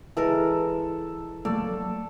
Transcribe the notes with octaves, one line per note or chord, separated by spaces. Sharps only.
E3 G#3 A4 A#4
F#3 A3 A#3 A4 D5